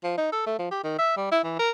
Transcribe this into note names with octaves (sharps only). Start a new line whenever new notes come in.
F3
D#4
A4
A3
F3
G4
D#3
E5
G3
E4
E3
A#4